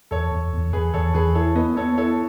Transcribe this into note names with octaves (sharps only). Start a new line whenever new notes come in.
E2 A4 C#5
E2
E2
E2 G#4 B4
E2 A4 C#5
E2 G#4 B4
E4 A4 C#5
B3 B4 D#5
B3 A4 C#5
E4 A4 C#5